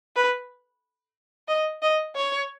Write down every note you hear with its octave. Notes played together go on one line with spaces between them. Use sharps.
B4
D#5
D#5
C#5